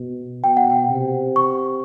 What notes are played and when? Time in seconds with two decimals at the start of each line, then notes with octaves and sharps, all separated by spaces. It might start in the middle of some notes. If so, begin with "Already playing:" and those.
Already playing: B2
0.44 B2 G5
0.57 F#5
0.70 G5
0.90 C3
1.36 C#6